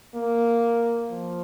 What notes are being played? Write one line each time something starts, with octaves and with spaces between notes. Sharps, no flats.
A#3
F3